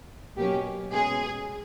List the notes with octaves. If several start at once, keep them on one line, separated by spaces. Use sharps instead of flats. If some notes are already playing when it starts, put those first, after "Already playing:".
B2 F#3 A#3 C#4 G4
B2 G#3 C#4 G#4